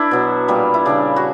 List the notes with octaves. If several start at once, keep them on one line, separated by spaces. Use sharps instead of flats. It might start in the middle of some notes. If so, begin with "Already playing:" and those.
Already playing: D4 E4 B4
B2 F#3
A#2 G3
E4
C#3 G3 D4
F#4